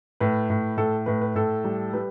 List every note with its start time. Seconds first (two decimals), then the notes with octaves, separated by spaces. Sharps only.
0.20 A2 B4
0.50 A2
0.77 A2 A4
1.06 A2 B4
1.21 B4
1.35 A2 A4
1.64 G3
1.93 G3 B4